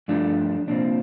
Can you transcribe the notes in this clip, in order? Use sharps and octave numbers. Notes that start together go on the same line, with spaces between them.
G2 F3 A3 D4
C2 A#2 F3 C4 D4